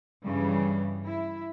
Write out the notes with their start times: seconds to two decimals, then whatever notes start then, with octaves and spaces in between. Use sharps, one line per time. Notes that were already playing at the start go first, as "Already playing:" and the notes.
0.24 G2 C#3 E3 G3
1.06 E4